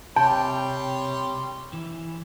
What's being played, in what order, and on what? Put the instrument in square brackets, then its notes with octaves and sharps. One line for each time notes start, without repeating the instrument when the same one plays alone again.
[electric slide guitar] C3 [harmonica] G3 C#5 C6 [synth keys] G5 [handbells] A5
[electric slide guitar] E3